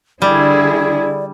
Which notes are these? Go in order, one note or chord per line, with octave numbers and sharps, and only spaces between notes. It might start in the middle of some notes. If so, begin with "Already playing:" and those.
D3 G3 E4 G#4 D5